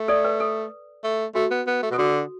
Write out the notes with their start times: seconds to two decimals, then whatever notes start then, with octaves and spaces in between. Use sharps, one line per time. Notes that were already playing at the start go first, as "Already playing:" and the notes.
Already playing: A3
0.08 A4 D5
0.25 B4
0.40 A4
1.04 A3
1.35 A3 F#4
1.51 B3
1.67 B3
1.82 A3
1.91 B2
1.93 A4
1.98 D3 F#4